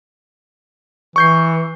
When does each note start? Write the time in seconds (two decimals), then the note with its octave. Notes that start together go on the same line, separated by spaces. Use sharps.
1.16 E3 C#6 G6 C7